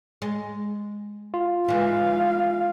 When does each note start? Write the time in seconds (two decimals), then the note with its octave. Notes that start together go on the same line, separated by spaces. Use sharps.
0.22 G#3
1.34 F4
1.68 E3 G#3 F5